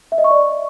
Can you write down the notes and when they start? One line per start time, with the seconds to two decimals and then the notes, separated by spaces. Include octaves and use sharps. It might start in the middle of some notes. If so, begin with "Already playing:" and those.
0.12 E5
0.18 D#5
0.24 C#6
0.31 D5